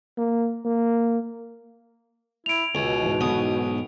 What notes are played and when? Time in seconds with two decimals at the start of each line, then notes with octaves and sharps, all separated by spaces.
0.18 A#3
0.65 A#3
2.46 E4 D7 F7
2.75 C#2 B2
3.03 G#2 E3
3.21 B1 D#6